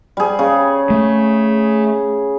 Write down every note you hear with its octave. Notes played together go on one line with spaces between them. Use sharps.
G3 G#4
C#3
A3